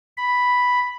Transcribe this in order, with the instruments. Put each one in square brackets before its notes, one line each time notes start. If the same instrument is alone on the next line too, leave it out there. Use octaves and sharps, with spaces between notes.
[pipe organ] B5